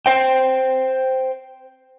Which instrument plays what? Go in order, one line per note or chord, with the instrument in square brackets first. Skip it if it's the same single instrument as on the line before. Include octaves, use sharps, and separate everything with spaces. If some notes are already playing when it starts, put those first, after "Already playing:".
[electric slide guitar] C5 G5